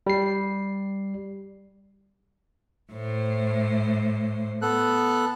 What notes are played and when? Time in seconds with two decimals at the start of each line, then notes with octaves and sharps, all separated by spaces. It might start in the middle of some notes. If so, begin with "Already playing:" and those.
0.07 G3 C7
2.91 A2 C5
4.62 B3 A4 F#6